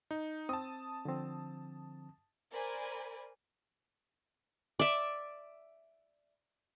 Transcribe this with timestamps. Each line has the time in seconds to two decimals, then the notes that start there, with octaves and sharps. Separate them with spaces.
0.11 D#4
0.49 C4 A5 D#6
1.05 D3 F3 C4
2.50 A#4 C5 D5 G#5 B5
4.79 D5 E5